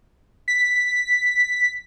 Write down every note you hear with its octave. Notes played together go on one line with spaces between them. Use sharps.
B6